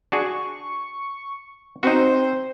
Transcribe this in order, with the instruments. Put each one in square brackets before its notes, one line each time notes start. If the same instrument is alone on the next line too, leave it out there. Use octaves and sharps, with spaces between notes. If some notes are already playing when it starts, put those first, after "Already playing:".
[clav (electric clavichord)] D4 F#4 G#4 [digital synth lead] C#6
[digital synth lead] C4 [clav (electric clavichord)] D#4 F#4 [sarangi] C5